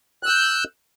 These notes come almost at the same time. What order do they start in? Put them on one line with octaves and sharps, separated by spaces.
F#6 E6 G6